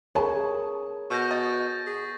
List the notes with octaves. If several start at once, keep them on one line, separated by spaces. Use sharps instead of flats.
C#3 G#4 A#4 B4 C#5 A5
B2 C#6 G6 A#6
D#5 A6
G#4